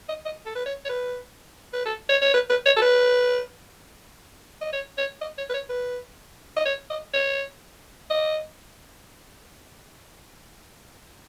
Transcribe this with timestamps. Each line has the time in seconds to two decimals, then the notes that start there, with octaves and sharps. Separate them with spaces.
0.09 D#5
0.25 D#5
0.46 A4
0.55 B4
0.66 C#5
0.85 C#5
0.89 B4
1.73 B4
1.86 A4
2.09 C#5
2.22 C#5
2.34 B4
2.50 B4
2.66 C#5
2.77 A4
2.82 B4
4.61 D#5
4.73 C#5
4.98 C#5
5.21 D#5
5.38 C#5
5.50 B4
5.54 C#5
5.69 B4
6.57 D#5
6.66 C#5
6.90 D#5
7.14 C#5
8.10 D#5